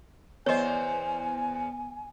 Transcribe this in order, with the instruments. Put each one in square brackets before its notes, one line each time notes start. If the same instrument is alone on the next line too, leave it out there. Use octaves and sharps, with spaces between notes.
[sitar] E2 C5 [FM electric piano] B3 [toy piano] C#5 D#5 [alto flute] G#5